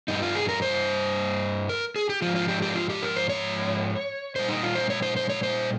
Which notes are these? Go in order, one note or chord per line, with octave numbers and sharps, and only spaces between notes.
G2 G3 D#4
F4
G#4
A#4
C5
A#4
G#4
G4
G#2 F3 F4
F4
G4
G4
F4
G4
A#4
C5
C#5
A#2 G3 C5
D#4
F4
C5
C#5
C5
C5
C#5
C5